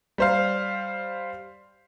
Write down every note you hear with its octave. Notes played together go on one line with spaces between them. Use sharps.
G3 C5 F5